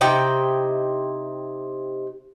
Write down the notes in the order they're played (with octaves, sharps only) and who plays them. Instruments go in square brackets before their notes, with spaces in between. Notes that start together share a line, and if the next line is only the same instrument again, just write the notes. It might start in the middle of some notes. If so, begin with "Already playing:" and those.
[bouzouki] C3 D#4 E4 G5